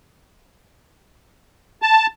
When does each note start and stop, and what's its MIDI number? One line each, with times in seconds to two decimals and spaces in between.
1.82 2.07 81